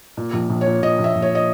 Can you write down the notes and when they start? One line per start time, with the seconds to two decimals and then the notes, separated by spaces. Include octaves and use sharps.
0.17 A#2
0.33 A#1
0.50 A#1
0.61 C#5
0.66 A#2
0.82 A#2 D#5
0.99 A#1
1.04 E5
1.15 A#1
1.22 C#5
1.35 D#5